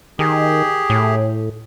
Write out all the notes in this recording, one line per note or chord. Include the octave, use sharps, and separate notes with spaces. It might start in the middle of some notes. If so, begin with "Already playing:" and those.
D#3 G4 G#4
A2